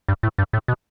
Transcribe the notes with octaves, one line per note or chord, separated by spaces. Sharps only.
G2
A2
G2
A2
B2